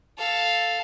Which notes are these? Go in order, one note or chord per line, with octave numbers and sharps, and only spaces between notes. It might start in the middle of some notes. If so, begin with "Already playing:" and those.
A4 F5